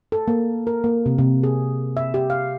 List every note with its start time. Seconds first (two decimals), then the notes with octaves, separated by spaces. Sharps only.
0.12 A4
0.28 A#3
0.67 A#4
0.84 A#3
1.06 C3
1.18 C3
1.43 G#4
1.97 E5
2.14 G4
2.30 F5